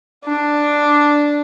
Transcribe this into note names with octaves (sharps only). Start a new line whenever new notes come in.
D4